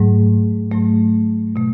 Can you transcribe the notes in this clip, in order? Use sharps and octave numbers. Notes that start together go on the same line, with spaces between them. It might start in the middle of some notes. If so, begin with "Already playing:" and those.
Already playing: G#2 F#3 A3
G#2 F#3 A3
B2 A3